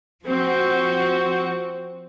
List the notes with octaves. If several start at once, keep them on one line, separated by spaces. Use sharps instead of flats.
F3 C4 F#4